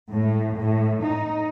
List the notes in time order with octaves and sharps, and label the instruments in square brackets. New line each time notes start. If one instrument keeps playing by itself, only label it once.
[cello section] A2
A2
D#4